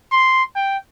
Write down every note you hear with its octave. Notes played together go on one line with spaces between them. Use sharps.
C6
G5